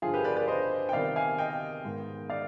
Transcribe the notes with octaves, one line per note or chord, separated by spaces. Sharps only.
G2 D3 F3 F4 G#4
G4 B4
B4 D5
B4 D5
C5 D#5
G5
C3 D#3 G3 B3 D5 F5
F5 G#5
D#5 G5
G#2 D#3 B3
D5 F5